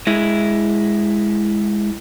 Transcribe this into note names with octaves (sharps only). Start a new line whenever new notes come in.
G#3 E4